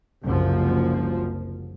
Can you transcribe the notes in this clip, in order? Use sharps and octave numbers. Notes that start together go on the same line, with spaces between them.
F#1 C2 F3